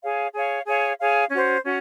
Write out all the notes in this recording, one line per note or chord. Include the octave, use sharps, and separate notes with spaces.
G#4 C#5 F5
G#4 C#5 F5
G#4 C#5 F5
G#4 C#5 F5
C#4 F#4 C5
C#4 F#4